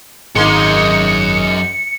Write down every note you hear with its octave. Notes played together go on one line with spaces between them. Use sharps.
G#1 F#2 G#3 A#3 D#4 C6 C#7